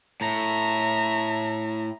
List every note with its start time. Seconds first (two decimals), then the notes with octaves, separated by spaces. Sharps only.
0.21 A2 E5 A#5